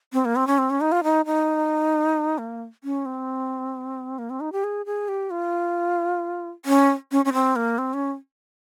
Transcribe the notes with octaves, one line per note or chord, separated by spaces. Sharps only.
C4
A#3
C4
C#4
C4
C#4
D#4
F4
D#4
D#4
A#3
C#4
C4
A#3
C4
D#4
G4
G#4
G#4
G4
F4
C#4
C#4
C#4
C4
A#3
C4
C#4